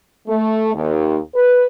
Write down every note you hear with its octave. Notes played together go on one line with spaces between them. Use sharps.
A3
D#2
B4